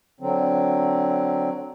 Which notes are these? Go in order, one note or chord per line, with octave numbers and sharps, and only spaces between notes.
D3 F#3 C4